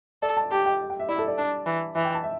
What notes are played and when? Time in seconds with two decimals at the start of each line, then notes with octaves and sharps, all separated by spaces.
0.22 A4 D5
0.37 A5
0.51 G4 A5
0.66 G5
0.90 G5
0.99 E5
1.09 E4 D5
1.18 A4
1.28 D5
1.38 D4
1.66 E3
1.95 E3 E5
2.05 G5
2.15 A5
2.24 E5